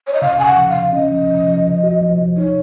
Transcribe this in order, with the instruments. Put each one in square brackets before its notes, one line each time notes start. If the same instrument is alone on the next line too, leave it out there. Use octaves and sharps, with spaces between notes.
[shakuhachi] C#5
D#5
[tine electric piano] C#3 [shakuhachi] F5
[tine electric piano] C#3 [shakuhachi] G#5
[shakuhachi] F#5
[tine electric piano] F3
[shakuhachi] F5
[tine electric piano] C#3
[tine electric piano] C#4 [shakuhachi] D#5
[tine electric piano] F3
F3
F3
F3
F#4
F3
F3
[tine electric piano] D#4 [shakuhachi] C#5